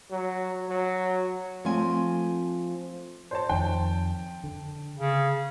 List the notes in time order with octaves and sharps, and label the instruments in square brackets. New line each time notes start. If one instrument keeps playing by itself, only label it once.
[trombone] F#3
F#3
[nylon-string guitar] F3 A3 C4 G#5
[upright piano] C5 C#5 A5
[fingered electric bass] F2 D#3 [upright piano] G5 A5
[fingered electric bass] D3
[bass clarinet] C#3